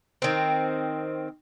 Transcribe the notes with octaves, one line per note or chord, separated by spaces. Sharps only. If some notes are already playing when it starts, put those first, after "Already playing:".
D#3 C4